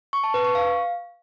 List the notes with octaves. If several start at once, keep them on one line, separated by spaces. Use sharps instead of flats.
C#6
A5
B4
C#6
F5